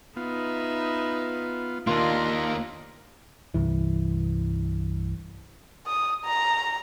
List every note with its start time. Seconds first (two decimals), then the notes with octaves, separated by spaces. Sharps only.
0.16 B3 D#4 F4 B4 E5
1.87 D#2 A#3 D4 F4 C6 A#6
3.54 C2 G2 E3
5.86 D#6
6.24 A#5